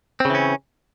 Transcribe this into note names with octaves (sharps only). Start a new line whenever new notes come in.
C#3 E3 C4 C#4